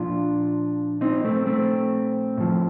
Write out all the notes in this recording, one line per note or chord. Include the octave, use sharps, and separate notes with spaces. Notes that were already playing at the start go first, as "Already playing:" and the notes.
Already playing: A#2 F3 D4 F4
C4 D#4
A3 C4
A3 C4
A2 F3